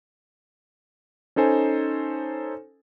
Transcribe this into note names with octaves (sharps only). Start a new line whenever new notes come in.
C#4 D#4 A4 C5 G#5